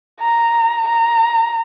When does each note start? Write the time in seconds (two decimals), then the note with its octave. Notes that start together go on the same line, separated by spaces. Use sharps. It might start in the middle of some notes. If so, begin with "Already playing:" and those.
0.20 A#5
0.87 A#5